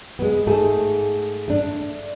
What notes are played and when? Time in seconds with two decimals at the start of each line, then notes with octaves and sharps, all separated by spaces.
0.19 G#3 B3
0.47 G#2 A3 G#4 A4
1.48 A3 D4